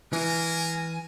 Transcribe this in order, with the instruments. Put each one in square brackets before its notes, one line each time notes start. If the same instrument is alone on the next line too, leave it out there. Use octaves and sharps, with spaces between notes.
[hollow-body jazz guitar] E3 [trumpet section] G#3 A#4 [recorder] G#5